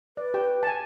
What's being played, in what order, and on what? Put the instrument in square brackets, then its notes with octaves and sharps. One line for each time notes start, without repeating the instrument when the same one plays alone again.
[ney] B4 [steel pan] D5
[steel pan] G4 G5
G#5 A5